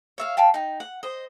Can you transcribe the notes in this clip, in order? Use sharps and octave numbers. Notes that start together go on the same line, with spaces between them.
C#5 E5 F5
F5 G5 A5 B5
D#4 G5
F#5
C5 D#5